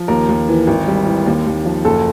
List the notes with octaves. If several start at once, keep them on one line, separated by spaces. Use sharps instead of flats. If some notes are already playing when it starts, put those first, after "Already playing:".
Already playing: F3
D#2 A#4
D#2
E3
G#1
G3
E3
D#2
D#2
F3
F#1 A4